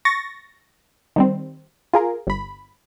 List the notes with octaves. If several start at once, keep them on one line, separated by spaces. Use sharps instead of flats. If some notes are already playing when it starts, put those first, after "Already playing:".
C#6 A6 A#6
D#3 G3 C4
F4 G#4 A#4
G1 B5